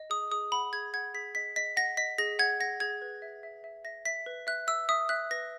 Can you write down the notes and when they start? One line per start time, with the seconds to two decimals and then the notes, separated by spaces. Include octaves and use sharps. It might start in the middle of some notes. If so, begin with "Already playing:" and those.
Already playing: D#5
0.10 G#4 D#6
0.32 G#4 D#6
0.52 F#5 B5
0.73 G#4 G#6
0.94 F#5 G#6
1.14 G#4 B6
1.35 D#5 B6
1.56 D#5 B6
1.77 F#5 A#6
1.97 D#5 B6
2.18 G#4 A#6
2.39 F#5 G#6
2.60 F#5 A#6
2.80 G#4 G#6
3.02 B4
3.22 E5
3.43 E5
3.64 E5
3.84 E5 A#6
4.05 E5 B6
4.26 B4
4.47 E5 F#6
4.67 E5 E6
4.89 E5 D#6
5.09 E5 F#6
5.31 B4 A#6